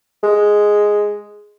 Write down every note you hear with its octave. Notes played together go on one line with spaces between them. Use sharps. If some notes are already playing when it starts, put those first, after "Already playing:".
G#3